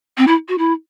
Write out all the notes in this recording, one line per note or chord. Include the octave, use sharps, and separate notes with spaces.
C4
E4
F#4
E4